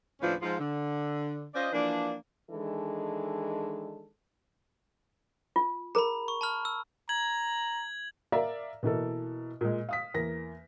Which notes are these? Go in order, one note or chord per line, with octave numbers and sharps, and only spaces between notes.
D#2 A2 F3 C#4 D4 B4
G#2 F3 F4
D3
C#4 F4 C5 D5 D#5
E3 F3 A#3 D4
D#3 E3 G#3 D4 A4
F4
G#4 A#4 A#5 B5
C#6
A5 B5 F6
E6
A#5 G#6 F#7
A#4 D5 E5 F5 A#5
B2 E3 A#3 A4
A#2 G#3
F5 D#6 B6
E2 A#3 A#6